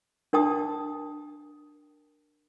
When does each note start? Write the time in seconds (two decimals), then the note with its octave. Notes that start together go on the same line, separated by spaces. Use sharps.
0.33 D4 A#4 G5 A5 D#6